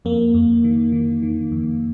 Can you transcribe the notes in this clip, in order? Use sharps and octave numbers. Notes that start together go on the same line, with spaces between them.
F2 A#3
F2
D#3
D#3
D#3
F2